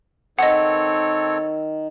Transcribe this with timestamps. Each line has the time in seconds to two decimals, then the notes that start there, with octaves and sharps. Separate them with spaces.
0.39 D#3 C4 A4 C#5 D#5 F#5